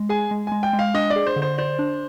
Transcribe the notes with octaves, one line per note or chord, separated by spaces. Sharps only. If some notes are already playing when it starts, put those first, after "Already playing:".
Already playing: G#3
G#4 G#5
G#3
G#3 G#5
G5
G#3
F5
D4 D#5
D5
G#4
C5
D3
C5
C5 D5
D4